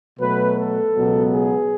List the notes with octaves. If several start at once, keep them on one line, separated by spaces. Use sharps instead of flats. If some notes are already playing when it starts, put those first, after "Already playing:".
B2 F#3 A3 B4
A4
C#2 B2 F#3 B3
G#4